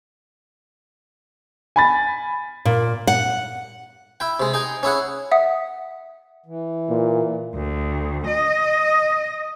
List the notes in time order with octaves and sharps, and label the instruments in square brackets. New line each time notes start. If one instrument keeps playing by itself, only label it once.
[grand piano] G#5 B5 A6
[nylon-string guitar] A#2
F#5
[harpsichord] E4 G5
C3 G#3
D#4 G#4 G5
C#4 E4 G#4 F#5
[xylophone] E5 F#5 D#6
[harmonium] E3
[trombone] A#2
[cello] D2
D#5